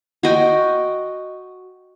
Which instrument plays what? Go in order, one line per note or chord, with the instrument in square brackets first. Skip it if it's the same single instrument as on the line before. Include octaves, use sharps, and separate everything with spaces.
[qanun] F#4 D#5 G5